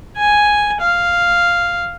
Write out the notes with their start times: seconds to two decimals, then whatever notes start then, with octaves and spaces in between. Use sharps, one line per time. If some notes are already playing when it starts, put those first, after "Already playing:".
0.17 G#5
0.81 F5